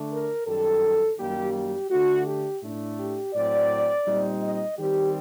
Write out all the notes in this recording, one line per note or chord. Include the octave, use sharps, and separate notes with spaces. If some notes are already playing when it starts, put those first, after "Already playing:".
Already playing: D3 A3 D4
A#4
F#2 D#3 G3 A4
F#2 D#3 G3 A#3 G4
G4
D3 A3 D4 F#4
G4
A2 A3 D4
G4
A2 F#3 C4 D5
A#2 G3 C4 D#4
D#5
D#3 G3 C4 G4